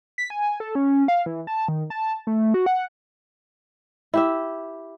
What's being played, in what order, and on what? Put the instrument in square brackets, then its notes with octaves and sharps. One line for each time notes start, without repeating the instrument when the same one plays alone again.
[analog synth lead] B6
G#5
A4
C#4
F5
E3
A5
D#3
A5
A3
F#4
F#5
[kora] E4 G4 E5